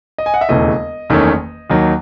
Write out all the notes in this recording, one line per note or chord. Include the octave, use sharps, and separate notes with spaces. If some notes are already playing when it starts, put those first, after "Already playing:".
D#5
G#5
F#5
E5
E1 D#2 C#3 E3 A3 D#5
F#1 E2 D#3 A3 C#4
D#2 D#3 F#3